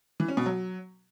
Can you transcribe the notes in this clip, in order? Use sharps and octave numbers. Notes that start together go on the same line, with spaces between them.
E3
C#4
B2
F#3